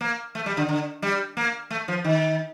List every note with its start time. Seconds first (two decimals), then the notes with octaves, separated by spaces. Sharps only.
0.01 A#3
0.35 A3
0.46 G3
0.57 D3
0.69 D3
1.02 G3
1.37 A#3
1.71 A3
1.88 F3
2.04 D#3